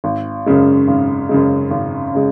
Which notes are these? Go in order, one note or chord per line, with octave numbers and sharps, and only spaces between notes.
G#1
F#2 C#3 G#3
G#1
F#2 C#3 G#3
G#1
C#3 G#3